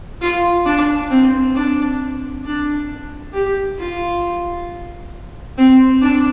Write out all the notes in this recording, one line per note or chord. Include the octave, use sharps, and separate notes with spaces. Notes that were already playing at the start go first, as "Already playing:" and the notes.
F4
D4
C4
D4
D4
G4
F4
C4
D4